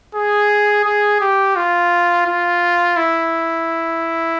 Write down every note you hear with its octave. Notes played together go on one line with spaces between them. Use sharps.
G#4
G#4
G4
F4
F4
E4